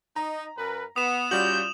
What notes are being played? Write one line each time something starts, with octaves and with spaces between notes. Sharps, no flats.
D#4 A#5
F#2 A#4 B4
B3 D#6 E7
G3 C#4 F4 F#4 D5 G6 F#7